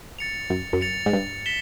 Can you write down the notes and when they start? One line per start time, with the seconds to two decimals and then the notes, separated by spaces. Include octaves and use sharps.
0.19 A6 C#7 F7
0.50 F#2
0.73 F#2
0.81 A6 C#7 F7
1.06 G#2
1.13 G2
1.46 B6 E7 G7